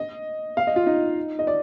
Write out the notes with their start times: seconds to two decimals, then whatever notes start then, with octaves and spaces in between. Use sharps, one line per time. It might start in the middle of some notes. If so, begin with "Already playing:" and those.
Already playing: D#5
0.57 F5
0.67 D#5
0.76 F4
0.87 D#4
1.39 D#5
1.47 D5